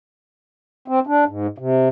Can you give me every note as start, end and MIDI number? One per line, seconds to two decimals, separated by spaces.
0.88 0.99 60
1.07 1.24 62
1.28 1.47 44
1.58 1.88 48